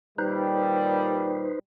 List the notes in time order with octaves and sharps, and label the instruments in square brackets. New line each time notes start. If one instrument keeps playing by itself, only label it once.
[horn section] A#2 D#3 G3 [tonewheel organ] D#4 B4 C5